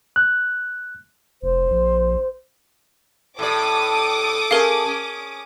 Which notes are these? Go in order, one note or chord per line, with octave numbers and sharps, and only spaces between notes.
F#6
F1 C5
A#1
A2 G3 A4 D5 D6 D#6
A3 C#4 G#4 A#4 F5
C#4